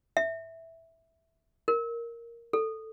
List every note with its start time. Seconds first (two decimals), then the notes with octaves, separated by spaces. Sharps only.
0.17 E5
1.68 A#4
2.53 A4